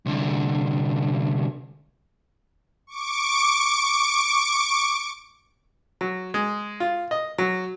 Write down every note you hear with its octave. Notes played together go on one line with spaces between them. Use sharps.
C2 D3
C#6 D6 D7
F#3
G#3
F4
D#5
F#3